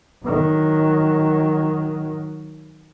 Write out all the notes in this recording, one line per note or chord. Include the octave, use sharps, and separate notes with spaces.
D#3 F#3